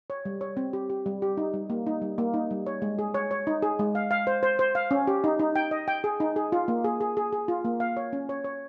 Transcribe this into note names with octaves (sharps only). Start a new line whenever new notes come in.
C#5
G3
C#5
C4
G4
G4
G3
G4
D#4
G3
A#3
D#4
G3
A#3
D#4
G3
C#5
G#3
G#4
C#5
C#5
D#4
G#4
G#3
F5
F5
C5
C5
C5
F5
C#4
G4
D#4
D#4
G5
D#5
G5
G#4
D#4
G#4
F4
A#3
G#4
G#4
G#4
G#4
F4
A#3
F5
C#5
C#4
C#5
C#5